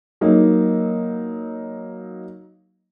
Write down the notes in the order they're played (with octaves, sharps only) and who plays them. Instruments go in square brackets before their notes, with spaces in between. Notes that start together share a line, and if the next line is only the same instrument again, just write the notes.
[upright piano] F#3 A#3 D#4